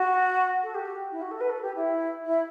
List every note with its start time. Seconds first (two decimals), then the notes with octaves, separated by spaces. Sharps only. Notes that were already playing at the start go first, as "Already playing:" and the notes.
Already playing: F#4
0.62 A4
0.74 G4
1.11 E4
1.21 F#4
1.30 A4
1.40 B4
1.49 A4
1.62 G4
1.74 E4
2.25 E4